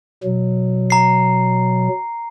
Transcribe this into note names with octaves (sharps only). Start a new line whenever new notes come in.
B2 F#3
A#5 C7